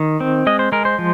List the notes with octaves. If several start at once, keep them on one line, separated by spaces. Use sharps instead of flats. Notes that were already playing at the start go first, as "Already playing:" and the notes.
Already playing: D#3
C4
G#3 D#5
C5
G#3 A#4
C5
F3